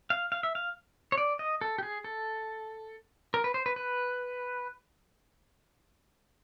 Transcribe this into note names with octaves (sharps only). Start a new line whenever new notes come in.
F5
F5
E5
F5
C#5
D5
D#5
A4
G4
G#4
A4
A#4
B4
C5
B4
B4